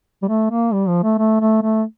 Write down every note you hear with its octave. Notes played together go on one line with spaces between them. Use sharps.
G3
A3
A#3
G3
F3
A3
A3
A3
A3